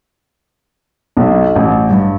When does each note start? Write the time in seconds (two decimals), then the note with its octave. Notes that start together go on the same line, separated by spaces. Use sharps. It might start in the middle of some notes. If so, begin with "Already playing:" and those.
1.17 B1
1.56 A1
1.90 G2